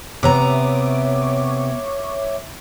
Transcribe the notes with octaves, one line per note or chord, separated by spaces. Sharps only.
C3 B3 C#5 E5 A#5 D6